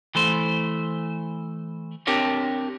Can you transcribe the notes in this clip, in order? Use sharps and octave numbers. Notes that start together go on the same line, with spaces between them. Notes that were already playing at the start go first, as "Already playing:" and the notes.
E3 A3 C5
C4 D4 G4 A#4 C#5